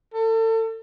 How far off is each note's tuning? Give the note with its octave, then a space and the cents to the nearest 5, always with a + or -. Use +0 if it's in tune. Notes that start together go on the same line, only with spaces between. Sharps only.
A4 +35